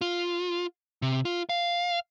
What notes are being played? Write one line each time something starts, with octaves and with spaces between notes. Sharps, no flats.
F4
C3
F4
F5